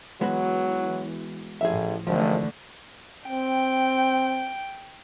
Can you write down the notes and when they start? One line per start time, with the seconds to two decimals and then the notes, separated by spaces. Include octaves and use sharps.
0.21 E3 F#3 G#3 B3 F#4
1.61 A1 A2 F3 G#4 E5
2.07 G#1 D3 E3 F3 A3
3.28 C4 G5